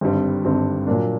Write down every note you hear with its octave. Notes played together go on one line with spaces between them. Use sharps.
G#1 G2 D3 G3 C4
G#1 G2 D3 G3 C4
A#2 F#3 A#3 D4